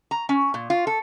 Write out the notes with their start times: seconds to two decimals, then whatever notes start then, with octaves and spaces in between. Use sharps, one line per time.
0.11 A#5
0.29 C#4
0.54 A#2
0.70 F4
0.87 A4